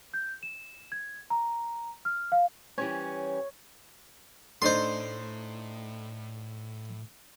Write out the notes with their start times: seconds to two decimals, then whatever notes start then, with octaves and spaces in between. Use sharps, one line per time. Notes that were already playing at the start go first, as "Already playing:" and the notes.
0.14 G6
0.43 E7
0.92 G#6
1.30 A#5
2.05 F6
2.32 F5
2.78 E3 G3 C#4 C#5
4.62 A2 A3 D4 D#4 C5 C6